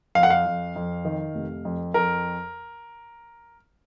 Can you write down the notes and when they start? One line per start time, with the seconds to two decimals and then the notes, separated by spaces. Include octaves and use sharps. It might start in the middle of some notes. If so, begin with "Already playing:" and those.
0.15 F2 F5
0.23 F#5
0.30 F5
0.46 F2
0.76 F2
1.05 D#3
1.35 F1
1.65 F2
1.94 F2 A#4